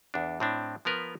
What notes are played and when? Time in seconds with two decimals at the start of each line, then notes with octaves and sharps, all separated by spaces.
0.14 E2 D4
0.40 A2 C4 D4
0.85 F3 B3 A#4 B4